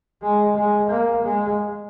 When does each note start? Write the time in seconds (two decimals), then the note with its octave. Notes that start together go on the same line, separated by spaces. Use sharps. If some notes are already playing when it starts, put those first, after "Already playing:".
0.22 G#3
0.56 G#3
0.90 A#3
1.24 G#3